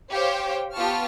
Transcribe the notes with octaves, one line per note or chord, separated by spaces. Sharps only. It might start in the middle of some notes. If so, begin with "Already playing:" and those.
G4 C5 C#5 F5 G5
B3 F4 G4 A5 C#6 F6